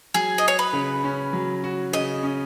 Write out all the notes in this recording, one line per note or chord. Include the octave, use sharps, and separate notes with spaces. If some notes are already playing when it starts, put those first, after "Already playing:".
F#3 G#4
D#5
F#4 C#5
B4
C#3
C#4
F#3
F#4
C#3 D#5
C#4